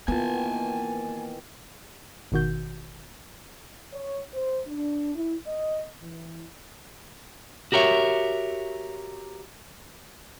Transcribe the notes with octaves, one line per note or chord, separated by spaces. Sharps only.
D#3 E3 A#3 B3 F4 G#5 A5
G#1 B2 D#3 F#4 G6
C#5
C5
D4
E4
D#5
E3
F#4 G4 A#4 C#5 E5